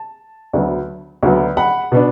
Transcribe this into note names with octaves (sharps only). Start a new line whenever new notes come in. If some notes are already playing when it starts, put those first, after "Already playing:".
Already playing: A5
D2 D3 F#3 B3
D2 D3 F#3 B3
F#5 B5
B2 B3 D4